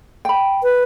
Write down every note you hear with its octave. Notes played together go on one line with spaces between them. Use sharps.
G5 B5
B4